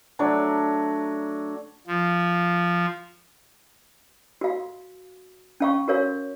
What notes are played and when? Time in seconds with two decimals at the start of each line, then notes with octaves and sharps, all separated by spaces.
0.19 F#3 A3 D4
1.87 F3
4.41 F#4 F5
5.60 C#4 F5 C#6
5.88 F#4 A#4 C#5 F5